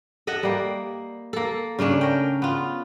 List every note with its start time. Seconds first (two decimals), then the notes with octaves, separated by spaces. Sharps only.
0.27 A4 D#5 E5 F#5
0.43 G3 A#3
1.33 A#3 A4
1.79 C#3 A3 C#4 D4
2.01 A#4 G5
2.42 B3 F4